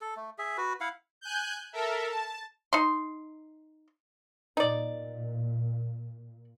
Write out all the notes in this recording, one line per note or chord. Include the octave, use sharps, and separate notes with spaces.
A4
A3
G#4 E5
F#4 B4
E4 F5 F#5
G#5 F#6 G6
A4 A#4 E5
A5
D#4 C6
A#2 D#4 D5